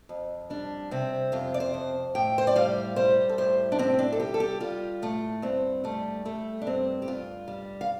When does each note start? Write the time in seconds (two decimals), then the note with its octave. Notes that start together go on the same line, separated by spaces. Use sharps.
0.09 F2
0.50 G3 D4
0.91 C3 C4
1.32 F2 F4
1.54 D5
1.60 C5
1.74 F2
2.15 A2 G5
2.38 C5
2.47 D5
2.56 G3 F5
2.96 G3 C5
3.29 A4
3.38 A2 C5
3.72 D4
3.79 A2 C4
3.99 D4
4.12 A4
4.20 G3 G4
4.34 A4
4.40 G4
4.60 G3 F4
5.02 A2 A3
5.42 G2 C4
5.84 G3 A3
6.25 G3 A3
6.62 D4
6.67 G2 C4
7.02 G4
7.07 G2 F4
7.48 G3
7.81 F5